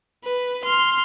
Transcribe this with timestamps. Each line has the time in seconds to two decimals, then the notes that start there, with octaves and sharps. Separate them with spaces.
0.24 B4
0.64 C6 F6